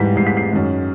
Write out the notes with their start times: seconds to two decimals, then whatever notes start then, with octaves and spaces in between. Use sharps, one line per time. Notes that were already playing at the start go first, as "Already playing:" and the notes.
Already playing: G#2 E3 G3 B6
0.15 G#2 E3 G3 C7
0.27 B6
0.37 C7
0.51 F#2 D#3 G#3